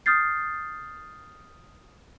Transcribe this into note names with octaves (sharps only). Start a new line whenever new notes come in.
D#6 F6 G6 A6 C7